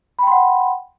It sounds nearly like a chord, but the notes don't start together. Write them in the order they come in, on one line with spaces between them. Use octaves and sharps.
B5 G5 C6 F#5